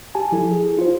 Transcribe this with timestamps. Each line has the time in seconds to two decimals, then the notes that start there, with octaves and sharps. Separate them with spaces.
0.15 G4 G#5 A5
0.32 F3 E4 A4
0.51 G#4
0.77 E4 F4 G4 C5